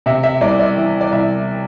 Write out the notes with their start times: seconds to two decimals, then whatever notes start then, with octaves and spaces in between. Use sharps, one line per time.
0.06 C3 E5
0.23 E5
0.41 C2 D5
0.60 D5
0.76 E3
1.01 D5
1.12 C2 E5